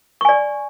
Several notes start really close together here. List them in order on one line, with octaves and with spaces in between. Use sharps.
C#6 G#5 D5